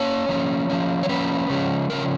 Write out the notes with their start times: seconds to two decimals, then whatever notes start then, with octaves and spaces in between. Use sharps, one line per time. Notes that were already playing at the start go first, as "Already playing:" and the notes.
Already playing: A#3 C#4 C#5
0.29 F3 A#3 C#4
0.70 F3 A#3 C#4
1.03 C#5
1.09 F3 A#3 C#4 B4
1.50 C#3 F3 G#3 C#4
1.90 C#3 F3 C#4 A#4